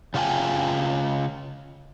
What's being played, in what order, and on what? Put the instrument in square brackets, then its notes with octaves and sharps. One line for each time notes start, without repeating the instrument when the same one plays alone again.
[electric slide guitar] C#3 F4 D5 G5 G#5